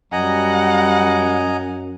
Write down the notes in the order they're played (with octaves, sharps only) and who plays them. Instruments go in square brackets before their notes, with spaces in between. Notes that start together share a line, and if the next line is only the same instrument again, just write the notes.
[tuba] F#2 [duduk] G3 [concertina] D#5 G#5 A#5 [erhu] F#5